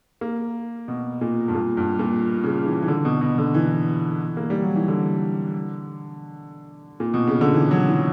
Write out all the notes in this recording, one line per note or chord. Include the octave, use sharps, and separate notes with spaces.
A#3
B2
A#2
G2
A#2
G2
A#2
C#3
E3
E3
D3
B2
B2
D3
E3
A#3
G3
F#3
E3
D3
A#2
B2
C#3
D3
E3
F#3
E3